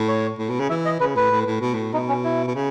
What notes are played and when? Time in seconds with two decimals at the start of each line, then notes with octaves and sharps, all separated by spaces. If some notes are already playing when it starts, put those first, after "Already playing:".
Already playing: A2
0.08 C#5
0.38 A2
0.49 B2
0.60 C#3
0.70 E3 E5
0.85 D#5
1.00 C#3 B4
1.16 A2 B4
1.31 A2
1.47 A2
1.61 B2
1.74 A2
1.93 B2 D#4
2.08 C#4
2.24 E4
2.47 B2
2.55 C#3